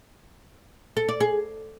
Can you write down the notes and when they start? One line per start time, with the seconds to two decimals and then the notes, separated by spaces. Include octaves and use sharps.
0.97 A4
1.09 D5
1.20 G#4